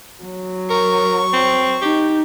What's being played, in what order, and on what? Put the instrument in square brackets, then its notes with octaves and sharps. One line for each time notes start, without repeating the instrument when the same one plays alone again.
[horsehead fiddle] F#3
[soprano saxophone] A#4 [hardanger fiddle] C#6
[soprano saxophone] C4
[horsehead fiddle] D#4 [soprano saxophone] G4